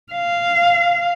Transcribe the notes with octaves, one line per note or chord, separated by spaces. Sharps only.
F5